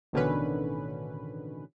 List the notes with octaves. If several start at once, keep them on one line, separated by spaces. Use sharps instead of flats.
A1 B2 D3 D#3 C#4 B4